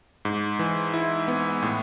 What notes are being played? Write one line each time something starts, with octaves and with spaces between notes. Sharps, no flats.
G#2
E3
E4
B3
A2